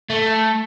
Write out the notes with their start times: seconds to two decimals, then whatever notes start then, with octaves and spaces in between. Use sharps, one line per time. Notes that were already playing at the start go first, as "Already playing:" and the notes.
0.10 A3